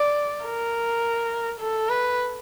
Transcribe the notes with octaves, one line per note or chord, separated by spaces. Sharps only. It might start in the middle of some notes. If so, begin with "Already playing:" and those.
Already playing: D5
A#4
A4
B4